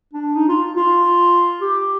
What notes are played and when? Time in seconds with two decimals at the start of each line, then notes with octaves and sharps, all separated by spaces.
0.13 D4
0.35 D#4
0.49 F4
0.76 F4
1.62 G4